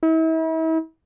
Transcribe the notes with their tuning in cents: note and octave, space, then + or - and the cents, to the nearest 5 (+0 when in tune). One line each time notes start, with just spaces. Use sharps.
E4 -40